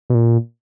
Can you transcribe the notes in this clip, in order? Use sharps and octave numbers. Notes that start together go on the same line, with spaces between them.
B2
A#2